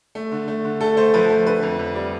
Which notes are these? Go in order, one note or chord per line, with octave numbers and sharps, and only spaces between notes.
A3
D3
A3
D3
A3 A4
A3 C5
F3 B4
A3
D3 B4
F2
F2
G3